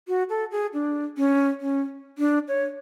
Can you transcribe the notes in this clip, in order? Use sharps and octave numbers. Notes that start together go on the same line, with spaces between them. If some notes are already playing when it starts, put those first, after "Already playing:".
F#4
A4
G#4
D4
C#4
C#4
D4
C#5